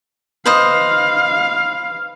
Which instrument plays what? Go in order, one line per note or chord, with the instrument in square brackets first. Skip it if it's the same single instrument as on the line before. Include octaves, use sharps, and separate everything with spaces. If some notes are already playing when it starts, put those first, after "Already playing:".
[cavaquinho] B4 C5 D#5 [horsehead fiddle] F5